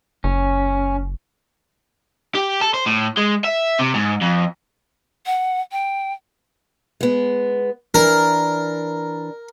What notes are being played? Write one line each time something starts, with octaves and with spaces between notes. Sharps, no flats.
F#1 C#4
G4
A4
C5
A2
G#3
E5
C3
G#2
F2
F#5
G5
G#3 B3
E3 D4 A#4